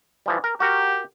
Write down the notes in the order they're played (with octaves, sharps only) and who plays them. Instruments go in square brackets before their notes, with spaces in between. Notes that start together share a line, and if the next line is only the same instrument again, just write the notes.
[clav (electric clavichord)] E3 F3 G3
A#4
[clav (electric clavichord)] F#4 A#4 [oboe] G4